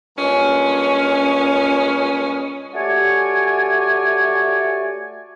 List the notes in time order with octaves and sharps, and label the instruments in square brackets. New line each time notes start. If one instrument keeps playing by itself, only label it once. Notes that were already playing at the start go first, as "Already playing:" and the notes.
[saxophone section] G2 A#2 G#3 C#4
[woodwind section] A3 F#4 G4 C#5 D5 G#5